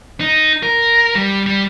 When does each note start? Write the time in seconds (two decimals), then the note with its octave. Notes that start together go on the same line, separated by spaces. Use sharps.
0.20 D#4
0.63 A#4
1.15 G3
1.46 G3